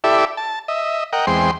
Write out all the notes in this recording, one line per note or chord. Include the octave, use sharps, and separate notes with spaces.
E4 G4 A4 D5 E5
A5
D#5 E5
A#4 D#5 F#5 G5
E2 G#3 C4 G5 C6